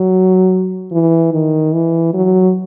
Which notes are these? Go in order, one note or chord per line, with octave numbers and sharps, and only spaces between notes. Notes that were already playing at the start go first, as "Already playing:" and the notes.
Already playing: F#3
E3
D#3
E3
F#3